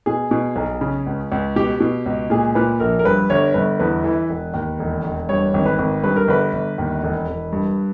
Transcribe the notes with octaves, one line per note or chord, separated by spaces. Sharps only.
B2 G#4
B2
B1
C#3
C#2
C#2
B2 G4
B2
C#2
A#2 G#4
A#2 B4
A#1 A#4
A#4
G2 B4
G1 C#5
G1 B4
E2 B4
E3
E1
D#2
E1
E1
G2 C#5
G#1
B4
G#1
G2 B4
A#4
G1 B4
G1
D#2
E1
E1
G2